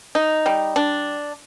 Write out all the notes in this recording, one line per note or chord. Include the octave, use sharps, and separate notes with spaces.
D#4
G3
D4